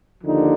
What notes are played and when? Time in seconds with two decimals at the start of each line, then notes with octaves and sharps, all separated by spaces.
0.24 D#2 D3 F3 D#4